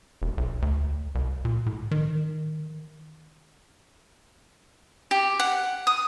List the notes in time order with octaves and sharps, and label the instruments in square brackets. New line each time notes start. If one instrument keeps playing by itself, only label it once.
[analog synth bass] E1
B1
D2
C2
A#2
A2
D#3
[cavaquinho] G4
F#5
D#6